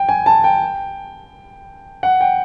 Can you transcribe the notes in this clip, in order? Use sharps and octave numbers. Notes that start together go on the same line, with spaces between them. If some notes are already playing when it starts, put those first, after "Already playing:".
Already playing: G5
G#5
A5
G5
F#5
G5